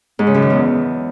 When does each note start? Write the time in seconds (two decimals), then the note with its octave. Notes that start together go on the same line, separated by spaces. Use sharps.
0.19 G#2
0.27 C#3
0.34 F#2
0.42 D#3
0.50 E2